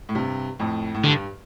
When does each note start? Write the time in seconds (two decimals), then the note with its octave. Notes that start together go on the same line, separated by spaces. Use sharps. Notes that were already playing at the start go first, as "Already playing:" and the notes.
0.09 A2
0.15 G2 C3
0.59 F2 A2
0.94 A2
1.03 G2 D3